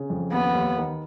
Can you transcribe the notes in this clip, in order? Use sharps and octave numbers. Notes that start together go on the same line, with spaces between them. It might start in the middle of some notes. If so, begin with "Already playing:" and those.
Already playing: C#3
F2
D#2 B3
D#2
D#3